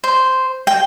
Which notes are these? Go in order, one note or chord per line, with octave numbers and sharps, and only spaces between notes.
C5
G5